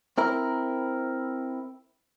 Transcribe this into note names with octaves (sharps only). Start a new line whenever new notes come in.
C4 E4 A#4